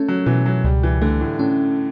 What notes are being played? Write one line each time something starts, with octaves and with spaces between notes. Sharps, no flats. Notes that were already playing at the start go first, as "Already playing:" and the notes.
Already playing: A3 C#4
F#3
B2 E3
F#3
C#2 G3
E3
D3 A3
A2
A2 C#4